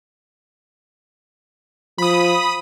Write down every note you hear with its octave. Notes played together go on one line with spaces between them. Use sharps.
F3 B5 D#6